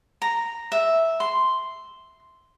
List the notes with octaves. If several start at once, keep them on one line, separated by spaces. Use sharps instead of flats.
A#5
E5
C6